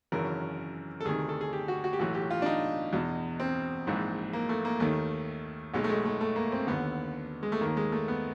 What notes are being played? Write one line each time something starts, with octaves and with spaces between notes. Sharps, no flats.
G#1 F#2 C#3 E3 A#4
A4
D2 C3 D#3 G#4
A4
G#4
G4
F#4
F#4
G4
B1 A2 E3 F#4
G4
F4
D4
D#4
E2 B2
C4
A#1 G#2 E3
A#3
A3
A#3
D#2 D#3 A3
B1 B2 G#3
A3
G#3
A3
A3
A#3
C4
D#2 D3 B3
G#3
A3
D#2 D#3 A#3
G#3
A3
B3